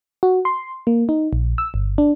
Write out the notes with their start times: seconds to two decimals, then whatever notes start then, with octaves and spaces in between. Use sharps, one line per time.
0.23 F#4
0.45 C6
0.87 A#3
1.09 D#4
1.33 A#1
1.58 E6
1.74 G1
1.98 D4